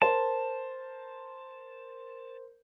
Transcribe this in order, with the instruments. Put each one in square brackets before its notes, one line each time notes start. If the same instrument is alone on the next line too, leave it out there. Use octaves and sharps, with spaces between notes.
[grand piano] A#4 C5 [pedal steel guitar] A5